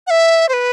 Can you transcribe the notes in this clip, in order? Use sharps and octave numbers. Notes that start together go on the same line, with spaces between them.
F#5
E5
C5
B4